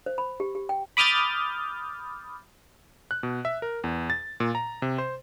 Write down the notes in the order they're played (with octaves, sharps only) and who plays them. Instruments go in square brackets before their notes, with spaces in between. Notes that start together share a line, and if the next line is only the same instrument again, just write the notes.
[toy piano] C5
B5
G4
G4
G5
[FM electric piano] B5 D6 D#6 F6 G6 A6
[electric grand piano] F#6
B2
E5
A#4
E2
A6
A#2
A#5
C3
C5